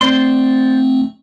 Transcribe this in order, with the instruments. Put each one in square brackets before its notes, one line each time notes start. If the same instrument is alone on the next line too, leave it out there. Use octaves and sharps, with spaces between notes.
[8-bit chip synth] A3 C4 [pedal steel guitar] C5 D5 C6